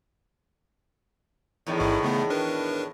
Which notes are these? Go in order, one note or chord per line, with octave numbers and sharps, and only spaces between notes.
E2 A2 D#3
A1 G#2 E4
C#3 A3 B3
D4 A#4 B4